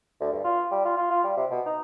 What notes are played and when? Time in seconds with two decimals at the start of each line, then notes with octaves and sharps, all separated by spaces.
0.21 D2
0.32 G2
0.44 F4
0.71 G3
0.85 F4
0.97 F4
1.11 F4
1.24 G3
1.37 C3
1.51 B2
1.66 D#4